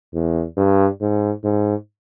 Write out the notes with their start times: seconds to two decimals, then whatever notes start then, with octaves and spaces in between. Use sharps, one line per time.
0.14 E2
0.57 G2
1.01 G#2
1.44 G#2